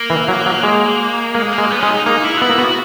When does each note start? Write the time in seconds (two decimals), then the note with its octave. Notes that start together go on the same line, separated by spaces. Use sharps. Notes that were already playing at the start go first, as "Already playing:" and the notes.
Already playing: A#3
0.10 E3
0.28 F#3
0.46 F#3
0.63 G#3
1.34 G#3 A#3
1.53 A#3
1.58 G#3
1.70 B3
1.79 G#3 C#4
1.88 D#4
2.06 A#3 D#4
2.24 E4
2.38 F#4
2.42 B3 E4
2.50 A#3
2.58 B3 F#4